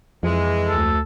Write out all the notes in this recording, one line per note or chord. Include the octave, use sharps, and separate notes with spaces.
F2 E3 G#3
D2 A4